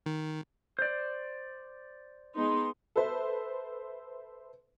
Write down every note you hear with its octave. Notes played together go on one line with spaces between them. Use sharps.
D#3
C5 D5
G#3 B3 D#4 C6
A4 B4 C5 E5